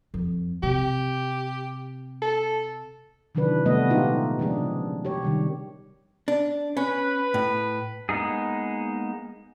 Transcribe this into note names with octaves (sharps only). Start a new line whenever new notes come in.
F2
C3 G4
A4
C3 D#3 E3 F#3 D4 B4
C3 G3 A3 B3 B4 D#5
A#2 G#3 D#4 F4 G4
C#3 F3 G#3 D4 G#4
G4 C#5
C3 D#3 G3
D4
C#4 B4
A2
G#3 A#3 B3 D#4 G#4